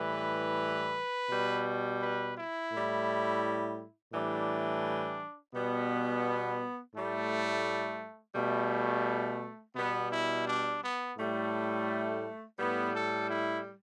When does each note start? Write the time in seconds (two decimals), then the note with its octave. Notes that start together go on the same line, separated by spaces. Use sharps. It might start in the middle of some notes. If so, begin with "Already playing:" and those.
Already playing: A2 E3 G3 B4
1.29 B2 G3
2.00 B4
2.35 E4
2.71 A2 G3
4.12 A2 E3 G3 D4
5.52 B2 G3 B3
6.94 A2 G3 A3
8.34 B2 G3 A3
9.75 B2 G3 B3
10.11 E4
10.46 D4
10.81 B3
11.17 A2 G3 A3
12.57 A2 G3 B3
12.93 A4
13.28 E4